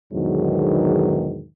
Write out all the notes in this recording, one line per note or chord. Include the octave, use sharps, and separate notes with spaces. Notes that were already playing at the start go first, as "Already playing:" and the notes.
E2 G#2 B2 D3 D#3 F#3